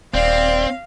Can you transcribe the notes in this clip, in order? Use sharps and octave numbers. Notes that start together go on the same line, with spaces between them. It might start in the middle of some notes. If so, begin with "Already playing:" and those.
D#1 C4 D5 F5